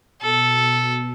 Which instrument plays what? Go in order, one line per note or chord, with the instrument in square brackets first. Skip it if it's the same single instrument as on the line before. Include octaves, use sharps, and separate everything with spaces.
[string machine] B2 [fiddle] A4